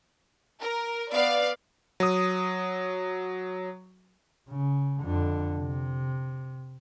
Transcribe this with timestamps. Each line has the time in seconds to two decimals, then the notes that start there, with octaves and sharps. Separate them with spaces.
0.61 A#4
1.11 B3 D5 F5
2.00 F#3 D#6
4.49 C#3
5.02 F2 D3
5.56 C3